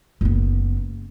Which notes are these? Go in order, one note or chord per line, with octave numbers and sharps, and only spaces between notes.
F#1 B3